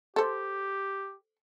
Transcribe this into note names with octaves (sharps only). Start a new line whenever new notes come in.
G4 A4 C5